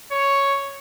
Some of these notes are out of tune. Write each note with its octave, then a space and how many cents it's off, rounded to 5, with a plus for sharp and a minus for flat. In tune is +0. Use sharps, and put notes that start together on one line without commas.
C#5 +0